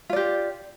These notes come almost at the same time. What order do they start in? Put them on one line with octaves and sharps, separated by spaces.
F4 D5 G4